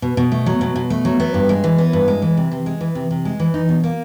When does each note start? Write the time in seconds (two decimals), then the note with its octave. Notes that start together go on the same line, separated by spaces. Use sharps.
0.02 B2
0.17 B2
0.32 A3
0.46 F#3
0.61 B2
0.76 B2
0.90 A3
1.05 F#3
1.20 B3
1.34 G2
1.49 G#3
1.64 E3
1.78 B3
1.93 G2
2.08 G#3
2.22 E3
2.37 C3
2.52 C3
2.66 G#3
2.81 E3
2.95 C3
3.11 C3
3.25 G#3
3.40 E3
3.54 D#4
3.69 B2
3.84 A#3